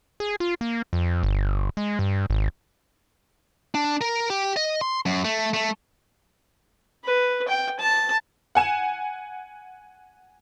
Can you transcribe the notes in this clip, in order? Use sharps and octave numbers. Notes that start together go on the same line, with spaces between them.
G#4
F4
A#3
F2
G1
G#3
G2
G#1
D4
A#4
G4
D#5
C6
F#2
A3
A3
B4
G5
A5
F#5 G#5 E7